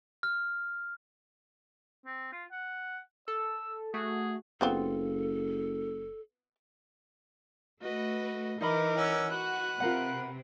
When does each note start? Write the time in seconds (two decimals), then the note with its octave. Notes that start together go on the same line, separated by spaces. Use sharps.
0.23 F6
2.06 C4
2.32 F4
2.52 F#5
3.28 A4 E6
3.94 A3 F#4 G#4
4.61 F#1 B3 C4 F4 A4
7.82 A3 F#4 B4 D#5
8.61 E3 D#4 A#4 D#5 B5 D6
8.97 C#4 F#5 E6
9.30 F#4 B4 F#6
9.80 C3 F4 A#4 F#5